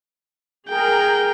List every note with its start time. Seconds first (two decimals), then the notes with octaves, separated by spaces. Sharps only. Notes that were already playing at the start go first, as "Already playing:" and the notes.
0.69 G#4 A#4 G5